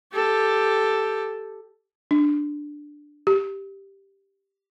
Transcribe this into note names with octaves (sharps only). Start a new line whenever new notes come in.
G4 A4
D4
G4